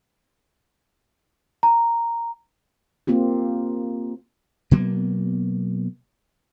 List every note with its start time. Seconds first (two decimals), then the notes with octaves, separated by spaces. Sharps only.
1.63 A#5
3.07 A#3 C4 F4 G4
4.71 B2 F#3 A#3 B3